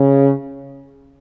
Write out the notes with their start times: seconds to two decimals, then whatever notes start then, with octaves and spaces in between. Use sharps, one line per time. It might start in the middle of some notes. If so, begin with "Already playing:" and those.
Already playing: C#3